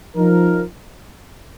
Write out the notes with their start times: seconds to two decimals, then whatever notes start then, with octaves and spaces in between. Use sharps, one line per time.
0.15 F3 D#4 A#4